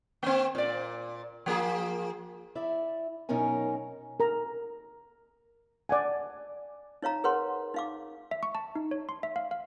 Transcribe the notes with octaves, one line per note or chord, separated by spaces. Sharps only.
A#3 C4
A#2 D5
F3 A#3 G#4
E4 D5 E5
F#2 B2 C#4 D#4 A#4 G#5
A#4 A#5
D5 F#5 G#5
D#4 C#5 F5 A#5
G#4 A#4 B4 C#5 F#5 C6
D#4 F5 D6
E5
C#6
A5
D#4
C#5
C6
E5
F5
F5